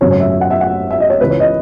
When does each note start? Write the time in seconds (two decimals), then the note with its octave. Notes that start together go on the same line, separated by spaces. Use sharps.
0.01 G#1 F#2 C#3 F#3 A3 C#5
0.11 C#5
0.20 E5
0.30 E5
0.41 F#5
0.50 E5
0.61 F#5
0.90 E5
1.00 D#5
1.10 C#5
1.20 C#2 C#3 E3 B4
1.30 C#5
1.40 D#5